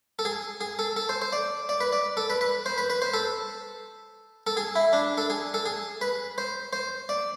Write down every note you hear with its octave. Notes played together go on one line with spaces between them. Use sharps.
A4
G#4
G#4
A4
A4
C5
C5
D5
D5
B4
D5
A4
B4
B4
C5
B4
B4
C5
A4
A4
G#4
E4
D4
A4
G#4
A4
G#4
B4
C5
C5
D5